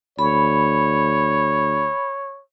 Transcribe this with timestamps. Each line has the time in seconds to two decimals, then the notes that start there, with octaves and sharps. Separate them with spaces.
0.19 D2 C#5 B5